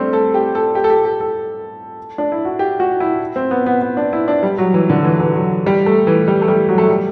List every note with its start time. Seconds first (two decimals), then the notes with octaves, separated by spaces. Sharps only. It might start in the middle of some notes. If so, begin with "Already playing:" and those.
Already playing: G3 A3 C4 D4
0.13 A4
0.34 G4
0.55 A4
0.75 G4
0.84 A4
0.90 G4
1.05 G4
1.20 A4
2.18 D4
2.32 E4
2.45 F#4
2.59 G4
2.80 F#4
3.00 E4
3.36 C4
3.51 B3
3.66 B3
3.82 B3
3.97 D4
4.13 E4
4.28 D4
4.43 G3
4.58 F#3
4.74 E3
4.89 D3
5.05 E3
5.20 E3
5.35 F#3
5.66 G3
5.86 A3
6.07 E3
6.28 G3
6.42 A3
6.48 G3
6.69 F#3
6.78 A3
6.89 G3